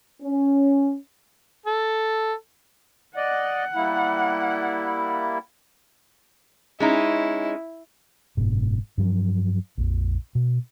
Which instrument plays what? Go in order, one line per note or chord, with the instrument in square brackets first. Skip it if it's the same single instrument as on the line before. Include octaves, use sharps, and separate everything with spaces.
[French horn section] C#4
[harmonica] A4
[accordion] D5 D#5 [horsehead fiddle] F#5
[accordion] G3 A#3 E4
[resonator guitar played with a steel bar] G#3 C#4 D#4 [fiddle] E4
[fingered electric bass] F#1 G#2 B2
G2 F3 F#3
A#1 F2
B2